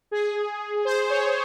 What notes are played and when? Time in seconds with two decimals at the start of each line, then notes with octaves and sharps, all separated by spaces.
0.11 G#4
0.85 C5
1.10 C#5